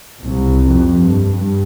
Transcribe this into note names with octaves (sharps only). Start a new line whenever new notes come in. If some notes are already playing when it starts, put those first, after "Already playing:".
C2
F2
G2
G2